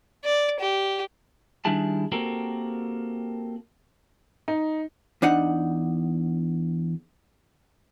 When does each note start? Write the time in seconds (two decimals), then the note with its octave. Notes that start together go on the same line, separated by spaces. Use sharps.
0.24 D5
0.61 G4
1.65 D#3 G3 D4 E4 G#4 A5
2.12 A#3 C4 F#4 G4 A4 A#4
4.48 D#4
5.22 E2 D4 D#4 F#5